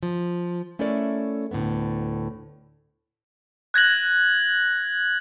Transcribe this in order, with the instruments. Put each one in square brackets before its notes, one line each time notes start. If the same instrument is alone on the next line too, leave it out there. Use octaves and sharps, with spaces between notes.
[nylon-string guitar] F3
A3 C#4 E4 A4 A#4 D5
D2 A2 D3 F#3 B3
[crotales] F#6 G#6 A#6 F#7